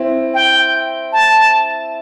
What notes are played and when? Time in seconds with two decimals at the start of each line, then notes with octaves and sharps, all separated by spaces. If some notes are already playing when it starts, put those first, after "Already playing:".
Already playing: C4 E4
0.34 G5
1.13 A5